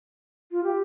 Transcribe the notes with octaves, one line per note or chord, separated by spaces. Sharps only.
F4
G4